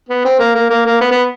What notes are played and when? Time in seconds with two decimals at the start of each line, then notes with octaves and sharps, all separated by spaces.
0.09 B3
0.25 C4
0.39 A#3
0.55 A#3
0.70 A#3
0.86 A#3
1.01 B3
1.11 B3